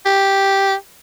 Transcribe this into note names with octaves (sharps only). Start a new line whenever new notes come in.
G4